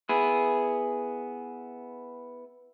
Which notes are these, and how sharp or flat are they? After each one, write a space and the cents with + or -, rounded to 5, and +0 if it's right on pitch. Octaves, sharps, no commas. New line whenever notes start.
B3 +0 E4 +0 G#4 +0